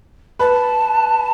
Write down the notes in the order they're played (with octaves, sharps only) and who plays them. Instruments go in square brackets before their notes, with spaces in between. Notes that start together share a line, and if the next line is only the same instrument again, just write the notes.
[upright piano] B4 [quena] A5